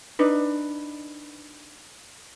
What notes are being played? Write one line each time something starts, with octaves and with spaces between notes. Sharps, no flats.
D4 D#4 B4